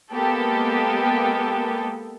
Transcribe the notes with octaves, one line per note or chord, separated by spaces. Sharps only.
G#3 A#3 B3 G4 A4